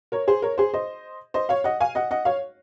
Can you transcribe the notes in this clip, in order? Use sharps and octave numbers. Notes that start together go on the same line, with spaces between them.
A#4 C#5
G#4 C5
A#4 C#5
G#4 C5
C5 D#5
C5 D#5
C#5 F5
D#5 F#5
F5 G#5
D#5 F#5
D#5 F#5
C#5 F5